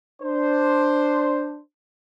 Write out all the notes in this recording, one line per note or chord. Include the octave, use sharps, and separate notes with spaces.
D4 C5